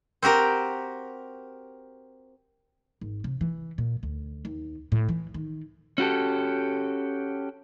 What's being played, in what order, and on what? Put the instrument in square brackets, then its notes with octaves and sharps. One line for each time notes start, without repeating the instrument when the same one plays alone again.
[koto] C4 F#4 G4 A#4
[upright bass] G#1
C3
E3
A#2
D2
D#2
A2
E3
D#3
[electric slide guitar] C#4 F#4 G4 A4